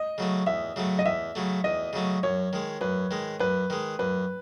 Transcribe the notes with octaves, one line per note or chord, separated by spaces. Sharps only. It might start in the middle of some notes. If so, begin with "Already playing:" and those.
Already playing: D#5
C#3 F#3 A3
E2 E5
C#3 F#3 A3
D#5
E2 E5
C#3 F#3 A3
E2 D#5
C#3 F#3 A3
F#2 C#5
D#3 G#3
F#2 B4
D#3 G#3
F#2 B4
D#3 G#3
F#2 B4